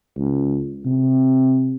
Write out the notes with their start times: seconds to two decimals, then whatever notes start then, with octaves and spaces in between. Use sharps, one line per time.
0.17 C#2
0.85 C3